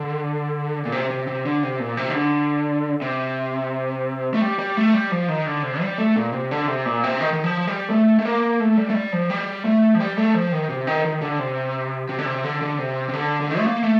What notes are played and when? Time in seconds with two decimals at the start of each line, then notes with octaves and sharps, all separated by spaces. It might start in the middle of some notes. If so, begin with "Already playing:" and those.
Already playing: D3
0.85 A#2
0.92 C3
1.10 C3
1.27 C3
1.45 D3
1.63 C3
1.80 A#2
1.97 C3
2.09 D#3
2.14 D3
3.02 C3
4.34 A3
4.41 G3
4.59 G3
4.77 A3
4.94 G3
5.11 F3
5.29 D#3
5.46 D3
5.63 C3
5.81 G3
5.98 A3
6.16 A#2
6.33 C3
6.51 D3
6.68 C3
6.86 A#2
7.04 C3
7.21 D#3
7.33 D#3
7.44 F3
7.67 G3
7.90 A3
8.19 A3
8.25 A#3
8.60 A3
8.78 G3
8.90 A3
8.95 G3
9.13 F3
9.30 G3
9.65 A3
9.95 F3
10.00 G3
10.17 A3
10.34 F3
10.52 D#3
10.69 C3
10.87 D#3
11.05 D#3
11.21 D3
11.39 C3
12.09 C3
12.19 D3
12.26 C3
12.44 D3
12.62 D3
12.78 C3
13.09 C3
13.14 D3
13.40 D3
13.49 D#3
13.58 A3
13.66 A#3
13.83 A3